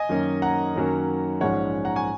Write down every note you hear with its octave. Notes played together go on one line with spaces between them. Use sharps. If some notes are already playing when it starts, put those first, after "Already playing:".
Already playing: D#5 G#5
F#2 D#3 A#3 C#4
F#5 A#5
F#2 D#3 F#3 A#3 C#4
A#1 G#2 G#3 C#4 C#5 F#5
F#5 A#5
G#5 C#6